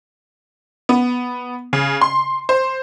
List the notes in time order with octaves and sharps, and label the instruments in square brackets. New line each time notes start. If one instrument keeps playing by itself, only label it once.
[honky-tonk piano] B3
C#3
C6
C5